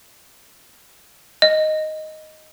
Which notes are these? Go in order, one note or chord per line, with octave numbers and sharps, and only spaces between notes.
D#5